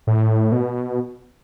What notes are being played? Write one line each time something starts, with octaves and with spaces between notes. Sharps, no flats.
A2
B2